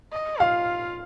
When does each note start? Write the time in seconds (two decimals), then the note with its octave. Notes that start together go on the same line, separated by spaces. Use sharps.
0.12 D#5
0.40 F4 F5